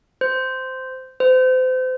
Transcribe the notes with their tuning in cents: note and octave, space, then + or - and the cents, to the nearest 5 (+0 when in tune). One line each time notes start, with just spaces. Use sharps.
C5 -10
C5 -35